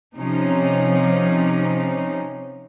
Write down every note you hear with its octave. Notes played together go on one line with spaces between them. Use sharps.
C3 F3 C#4 D#4